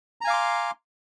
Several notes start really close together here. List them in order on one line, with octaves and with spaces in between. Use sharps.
A#5 G#5 F5 D6 C6